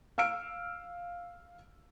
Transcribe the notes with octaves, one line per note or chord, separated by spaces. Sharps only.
F5 E6 F6 D7